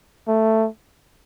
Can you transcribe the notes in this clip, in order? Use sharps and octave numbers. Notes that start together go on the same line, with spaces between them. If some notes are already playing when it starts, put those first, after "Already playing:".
A3